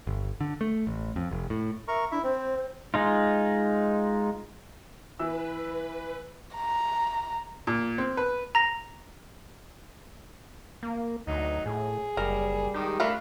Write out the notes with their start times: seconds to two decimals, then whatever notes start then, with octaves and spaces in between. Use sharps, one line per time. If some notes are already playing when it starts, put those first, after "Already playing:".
0.07 G1
0.41 D3
0.61 A3
0.87 A1
1.16 F2
1.31 F1
1.50 A2
1.88 A#4 E5 A#5 C#6
2.11 D4 E4 E5
2.23 C4 C5
2.94 G#3 D#4 F4
5.19 E3 B4 E6
6.57 A#5
7.67 A#2
7.98 C4
8.17 B4
8.55 A#5 A#6
10.83 A#3
11.27 D2 F#3 D#4
11.66 A2 G#4
12.17 F#1 G3 A#4
12.74 D#3 G#3 G4
13.00 A3 D4 A#4 F5 B5